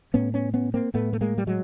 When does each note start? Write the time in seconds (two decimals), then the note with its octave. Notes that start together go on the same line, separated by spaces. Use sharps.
0.14 A2 B3 C#4
0.34 B3 C#4
0.54 B3 C#4
0.74 A#3 C4
0.94 A2 A3 B3
1.13 A3
1.21 G#3 A#3
1.38 G3
1.47 F#3 G#3